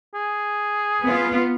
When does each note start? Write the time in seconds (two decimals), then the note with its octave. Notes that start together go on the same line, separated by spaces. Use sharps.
0.15 G#4
1.05 B3 F4